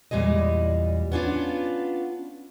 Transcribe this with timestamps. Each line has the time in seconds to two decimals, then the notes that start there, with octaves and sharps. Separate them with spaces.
0.11 E2 A#2 G3 G#3 D#5
1.12 B3 C#4 D4 F4